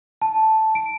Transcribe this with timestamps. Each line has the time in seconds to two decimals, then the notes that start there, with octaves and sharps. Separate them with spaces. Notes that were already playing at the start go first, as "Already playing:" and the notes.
0.22 A5
0.75 D7